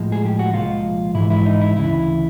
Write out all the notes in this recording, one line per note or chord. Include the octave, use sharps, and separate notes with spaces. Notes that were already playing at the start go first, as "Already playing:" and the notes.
Already playing: A2 F3 G#3
G#4
G4
F#4
C2 A#2 F3 G#3 F4
G#2 E3 G#3 E4
E4
D#4
E4
D2 C#3 E3 E4